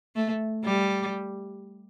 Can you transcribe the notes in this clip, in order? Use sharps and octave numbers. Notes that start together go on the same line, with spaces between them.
A3
G3